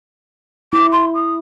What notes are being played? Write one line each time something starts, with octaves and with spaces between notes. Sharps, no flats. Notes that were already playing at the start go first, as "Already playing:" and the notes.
E4 D6
C6
D#6